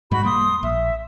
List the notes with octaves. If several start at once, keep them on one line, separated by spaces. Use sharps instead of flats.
G#2 G3 G#3 F#4 B5
E1 G3 A#3 C6 D#6
A#1 E5